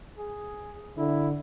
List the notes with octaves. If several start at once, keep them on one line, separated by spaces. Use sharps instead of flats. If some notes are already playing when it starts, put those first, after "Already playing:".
G#4
D3 E4